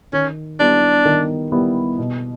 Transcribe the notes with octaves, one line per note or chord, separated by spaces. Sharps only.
D#3 C#4
G3 B3 D4 E4
D#3
G3 B3 E4
B2